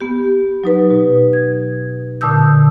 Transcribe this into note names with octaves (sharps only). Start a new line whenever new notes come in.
B3 G4
F#3 D#4 B4
B2
G#6
A#2 D3 A5 D#6 E6 G6